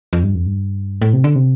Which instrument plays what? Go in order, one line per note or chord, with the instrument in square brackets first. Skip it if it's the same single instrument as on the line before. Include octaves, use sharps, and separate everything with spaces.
[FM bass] F2
G2
F2
G2
A2
C3
D3
C3